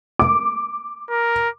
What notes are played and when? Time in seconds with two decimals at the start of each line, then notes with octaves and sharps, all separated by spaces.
0.19 D6
1.10 A#4